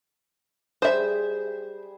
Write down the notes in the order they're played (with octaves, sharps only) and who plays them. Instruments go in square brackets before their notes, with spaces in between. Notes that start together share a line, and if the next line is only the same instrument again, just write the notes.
[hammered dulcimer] G3 G#4 [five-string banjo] C5 E5